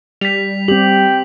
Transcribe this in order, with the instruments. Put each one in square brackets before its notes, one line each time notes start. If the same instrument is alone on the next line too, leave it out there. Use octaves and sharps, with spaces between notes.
[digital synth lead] G3 [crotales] B6 F7
[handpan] C4 G4 [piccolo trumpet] G5 [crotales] F#7